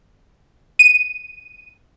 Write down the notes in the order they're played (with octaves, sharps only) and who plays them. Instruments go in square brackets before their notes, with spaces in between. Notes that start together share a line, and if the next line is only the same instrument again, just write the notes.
[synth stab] D#7